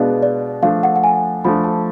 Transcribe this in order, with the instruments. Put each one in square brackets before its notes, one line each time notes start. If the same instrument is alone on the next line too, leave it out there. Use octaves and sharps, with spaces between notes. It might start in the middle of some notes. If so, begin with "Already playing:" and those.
Already playing: [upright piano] B2 G#3 B3 D4 [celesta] D5 F5
[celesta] D5
[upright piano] F3 A3 D4 [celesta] F5
[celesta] F#5
F#5
G#5
[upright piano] F3 A3 D4 [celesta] B5
[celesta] A5